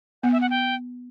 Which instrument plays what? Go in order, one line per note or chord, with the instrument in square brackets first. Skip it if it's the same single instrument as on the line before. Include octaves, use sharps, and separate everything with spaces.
[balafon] B3 [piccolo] F#5
[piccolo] E5
F#5
G5